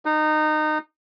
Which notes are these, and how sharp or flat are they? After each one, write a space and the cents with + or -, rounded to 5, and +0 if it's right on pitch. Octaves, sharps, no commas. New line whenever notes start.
D#4 -20